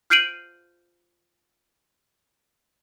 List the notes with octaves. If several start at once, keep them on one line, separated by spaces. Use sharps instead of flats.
F6 G6 C7 D7 D#7 F#7